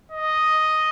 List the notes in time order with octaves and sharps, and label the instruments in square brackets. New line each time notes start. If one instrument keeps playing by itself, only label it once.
[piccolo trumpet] D#5